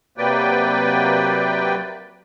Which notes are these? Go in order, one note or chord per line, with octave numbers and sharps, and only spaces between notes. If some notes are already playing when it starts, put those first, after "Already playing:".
C3 F#3 A#3 B4 D5 G5